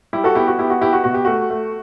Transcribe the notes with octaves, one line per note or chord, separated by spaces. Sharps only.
G3 E4 G4
F#4 A4
B3 E4 G4
F#4
B3 E4 G4
F#4
B3 E4 G4
F#4
B2 F#4
G4
A3 F#4
A3